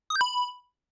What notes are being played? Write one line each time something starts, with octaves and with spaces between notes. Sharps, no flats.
D#6
G6
B5